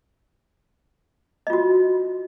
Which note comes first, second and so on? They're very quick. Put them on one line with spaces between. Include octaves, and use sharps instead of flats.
D#5 F4 F#4